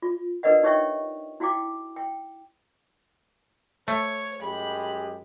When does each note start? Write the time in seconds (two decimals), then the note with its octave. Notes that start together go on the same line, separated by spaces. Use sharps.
0.02 F4
0.43 D4 A#4 B4 D5 D#5 F#5
0.63 D#4 G4 C#5 E5 G5 C#6
1.40 E4 F#4 F5 G5 D6
1.96 G5
3.88 A3 C#5
4.42 F#2 G#3 G4 B5